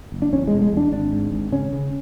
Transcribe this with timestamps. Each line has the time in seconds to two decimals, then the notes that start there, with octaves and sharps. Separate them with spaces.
0.12 F#1
0.22 D4
0.33 E2 C#4
0.48 G#3
0.53 E1
0.62 G#3
0.73 E2 D4
0.92 G#1 D4
1.12 G#2
1.32 G#1
1.52 C#3 C#4
1.73 C#3